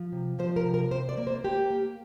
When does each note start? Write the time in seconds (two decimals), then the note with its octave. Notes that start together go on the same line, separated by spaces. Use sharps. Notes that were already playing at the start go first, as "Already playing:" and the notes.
Already playing: F3
0.12 C3
0.39 F3 C5
0.56 A#4
0.65 C3
0.74 A#4
0.91 C3 C5
1.09 D5
1.17 A#3
1.27 C5
1.44 A#3 G4
1.70 A#3